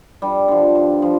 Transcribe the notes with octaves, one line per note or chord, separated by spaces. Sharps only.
G2 G3
D3 F3
G2
F3